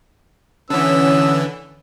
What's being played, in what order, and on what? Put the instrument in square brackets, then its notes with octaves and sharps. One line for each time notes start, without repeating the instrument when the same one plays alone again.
[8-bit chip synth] D3 E3 [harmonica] B3 E6 [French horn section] C#4